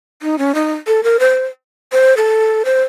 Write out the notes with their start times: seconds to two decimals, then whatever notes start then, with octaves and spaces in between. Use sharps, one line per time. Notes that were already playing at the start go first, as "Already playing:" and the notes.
0.22 D#4
0.38 C#4
0.55 D#4
0.87 A4
1.03 A#4
1.20 C5
1.92 C5
2.17 A4
2.65 C5